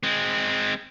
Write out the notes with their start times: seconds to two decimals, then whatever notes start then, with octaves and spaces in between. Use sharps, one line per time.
0.03 G#3 C4